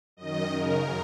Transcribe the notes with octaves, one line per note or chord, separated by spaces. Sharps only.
F#2 D#3 D#5
F#2 C#3 A#4